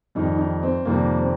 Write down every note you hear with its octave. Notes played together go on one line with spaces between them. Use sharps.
F2 D#3 G3 D#4
D#3 D#4
C4
F2 C3 D#3 G3 A#3
C4